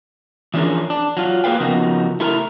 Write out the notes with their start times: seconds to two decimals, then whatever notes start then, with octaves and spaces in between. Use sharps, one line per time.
0.54 E3 F3 C#4 D4 G#4 A#4
0.90 D4
1.17 F#3 F4
1.44 A#3 G#4 B4 F5 G5
1.60 C#3 F3 B3 D#4 F#4 A#4
2.20 A3 E4 A#4 G#5 A#5